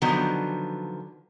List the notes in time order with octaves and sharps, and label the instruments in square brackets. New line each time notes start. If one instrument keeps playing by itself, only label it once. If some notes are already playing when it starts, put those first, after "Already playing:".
[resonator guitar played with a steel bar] D3 D#3 F3 F#3 B3